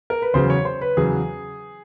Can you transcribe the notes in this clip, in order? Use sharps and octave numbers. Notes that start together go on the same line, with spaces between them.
A#4
B4
E2 C#3 F#3 C5
C#5
C5
B4
E2 C#3 F#3 G#4